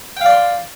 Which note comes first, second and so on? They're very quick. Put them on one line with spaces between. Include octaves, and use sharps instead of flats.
G5 F5 D5 C6